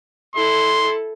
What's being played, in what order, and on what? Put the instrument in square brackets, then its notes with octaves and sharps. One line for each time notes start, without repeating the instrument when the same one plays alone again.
[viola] E4 A4 [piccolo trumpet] C6